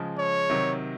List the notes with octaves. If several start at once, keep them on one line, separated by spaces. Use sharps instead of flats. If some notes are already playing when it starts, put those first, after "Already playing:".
Already playing: C#3 F3 G#3
C#5
C3 D#3 F#3